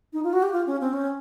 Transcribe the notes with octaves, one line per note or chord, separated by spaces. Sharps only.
D#4
F4
F#4
G4
F4
C#4
C4
C#4